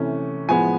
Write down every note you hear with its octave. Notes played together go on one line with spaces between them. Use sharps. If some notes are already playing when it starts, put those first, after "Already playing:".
Already playing: C3 E3 A3 C#4
A2 F3 G#3 B3 G#5